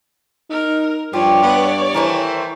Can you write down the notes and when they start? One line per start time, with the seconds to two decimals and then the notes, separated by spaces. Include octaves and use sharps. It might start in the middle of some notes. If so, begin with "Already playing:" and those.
0.50 D#4 A#4
1.13 G2 F3 G4 C#5 D5
1.43 B3
1.94 D#3 E3 A3 C5